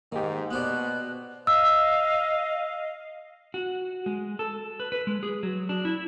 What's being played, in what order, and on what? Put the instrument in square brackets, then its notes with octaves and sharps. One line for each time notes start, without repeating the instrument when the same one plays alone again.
[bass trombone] G#2 [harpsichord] D#3 [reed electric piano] A#3 G4
[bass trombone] B2 [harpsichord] B3 C5 D5 [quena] F#6
[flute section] D#5 F5 [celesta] E6
[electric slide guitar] F#4
G#3
A4
B4
B4
G#3
G#4
F#3
D4
E4